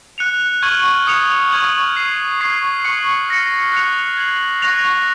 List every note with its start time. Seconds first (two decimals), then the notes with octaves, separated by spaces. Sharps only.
0.18 F#6 C#7 F7
0.62 C#6 F6 G#6 D#7 F#7
1.07 D#6 F#6 C#7 F7
1.52 C#6 F6 G#6 D#7 F#7
1.96 F6 C7 D#7 F#7
2.41 C#6 F6 G#6 C7
2.84 C#6 F#6 C#7 F#7
3.29 F6 A#6 C#7
3.73 F#6 C#7 F7
4.17 G#6 C7 F#7
4.62 C#6 F#6 A#6 F7